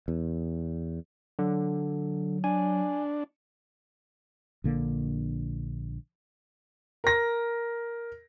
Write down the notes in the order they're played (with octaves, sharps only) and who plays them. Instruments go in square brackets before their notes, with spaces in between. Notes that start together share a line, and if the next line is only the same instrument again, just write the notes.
[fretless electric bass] E2
[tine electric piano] D3 [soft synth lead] F#3
[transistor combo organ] D4 [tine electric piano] G#5
[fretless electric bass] A#1 D3 A#3
[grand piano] A#4 A#6